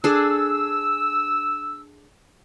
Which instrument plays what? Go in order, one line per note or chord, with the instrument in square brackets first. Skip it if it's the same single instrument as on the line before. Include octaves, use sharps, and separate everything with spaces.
[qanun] D4 G#4 A4 [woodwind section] E6